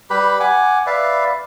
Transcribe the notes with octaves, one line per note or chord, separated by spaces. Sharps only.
G3 G4 B4 B5
F#5 G#5 D6
B4 D5 E5 F5